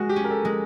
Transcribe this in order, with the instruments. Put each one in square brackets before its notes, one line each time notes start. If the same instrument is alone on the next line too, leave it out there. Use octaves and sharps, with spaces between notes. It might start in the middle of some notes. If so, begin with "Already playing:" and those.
Already playing: [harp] G#3 [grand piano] F#4
[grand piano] G4
[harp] C#4
[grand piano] A#4
A4
[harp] G#3